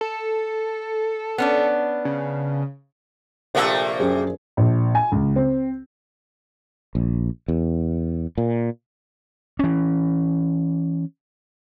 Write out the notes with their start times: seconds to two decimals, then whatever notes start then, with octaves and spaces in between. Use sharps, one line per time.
0.01 A4
1.38 B3 C#4 D4
2.05 C#3
3.55 A#1 C3 A3 A#3 A4
4.00 F#2 G#4
4.57 A#1
4.95 G#5
5.12 C#2
5.36 C4
6.95 A#1
7.48 E2
8.38 A#2
9.59 E3 C#4